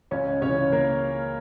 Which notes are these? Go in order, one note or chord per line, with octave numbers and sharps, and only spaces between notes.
C#2 C#4 C#5
C#3 E3 C#4 C#5
C#2 A#3 A#4